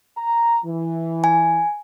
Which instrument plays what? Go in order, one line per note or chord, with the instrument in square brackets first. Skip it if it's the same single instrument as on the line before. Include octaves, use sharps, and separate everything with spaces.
[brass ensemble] A#5
E3
[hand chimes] G#5